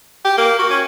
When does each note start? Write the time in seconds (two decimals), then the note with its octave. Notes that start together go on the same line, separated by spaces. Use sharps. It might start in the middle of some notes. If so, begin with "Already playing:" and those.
0.25 G4
0.38 A#3
0.59 F#4
0.70 C#4